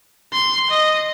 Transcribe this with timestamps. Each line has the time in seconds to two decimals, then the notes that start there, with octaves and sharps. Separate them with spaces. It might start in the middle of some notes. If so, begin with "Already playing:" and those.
0.33 C6
0.70 D#5